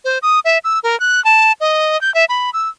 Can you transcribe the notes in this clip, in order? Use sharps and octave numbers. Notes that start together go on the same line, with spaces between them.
C5
D#6
E5
E6
A#4
F#6
A5
D#5
G6
E5
B5
E6